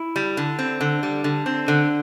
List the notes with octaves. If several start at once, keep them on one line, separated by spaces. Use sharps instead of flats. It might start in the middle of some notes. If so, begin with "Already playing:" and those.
Already playing: E4
G3
D3
C4
D3
G3
D3
C4
D3